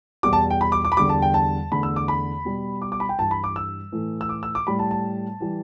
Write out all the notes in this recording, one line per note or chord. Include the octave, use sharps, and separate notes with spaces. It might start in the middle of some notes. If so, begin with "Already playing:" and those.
E2 B2 G3 D6
A5
G5
B5
D6
D6
B5
E2 D3 G3 D6
A5
G5
A5
E2 D3 A3 B5
E6
D6
B5
B2 G3
D6
D6
B5
G5
G2 E3 G3 A5
B5
D6
E6
A2 E3 A3
E6
D6
E6
D6
A2 G3 B5
A5
A5
E3 G3